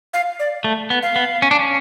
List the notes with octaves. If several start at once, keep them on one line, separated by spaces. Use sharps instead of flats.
F5
D5
A3
B3
F5
B3
C#4
D4
C#4